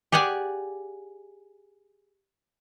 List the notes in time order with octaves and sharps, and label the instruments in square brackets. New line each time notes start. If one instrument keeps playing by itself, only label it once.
[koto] G4 G#4 D5 F#5 G#5